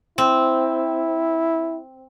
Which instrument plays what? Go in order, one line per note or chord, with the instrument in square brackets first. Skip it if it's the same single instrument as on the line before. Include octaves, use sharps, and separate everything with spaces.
[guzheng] C4 [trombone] E4